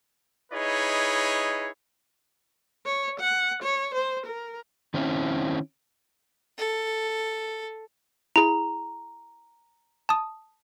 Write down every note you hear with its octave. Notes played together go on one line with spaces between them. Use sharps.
D#4 E4 G#4 B4 C#5 D#5
C#5
F#5
C#5
C5
A#4
D#3 C4 C#4 E4
A4
E4 G#4 A#5
A5 D#6